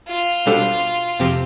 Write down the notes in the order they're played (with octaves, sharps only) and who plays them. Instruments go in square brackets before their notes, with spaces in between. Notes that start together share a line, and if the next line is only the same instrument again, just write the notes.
[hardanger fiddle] F4
[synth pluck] B2 G3 D4 A4 C5
F2 C3 F3 C4 G4